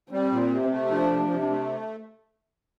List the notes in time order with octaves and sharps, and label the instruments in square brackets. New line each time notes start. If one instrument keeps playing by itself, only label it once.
[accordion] G3 [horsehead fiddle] C4
[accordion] A#2
C3
A3
[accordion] F3 [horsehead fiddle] D4
[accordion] C3
C3
A3